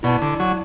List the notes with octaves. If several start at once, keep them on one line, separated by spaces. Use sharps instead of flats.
B2 E4 D5 A5
D3
F#3